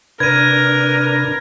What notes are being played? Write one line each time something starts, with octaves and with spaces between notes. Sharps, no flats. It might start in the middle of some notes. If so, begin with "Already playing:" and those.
C3 D4 A#4 B4 G#6 D#7